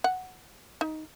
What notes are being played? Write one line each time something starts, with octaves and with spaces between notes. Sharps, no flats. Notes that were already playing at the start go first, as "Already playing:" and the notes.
F#5
D#4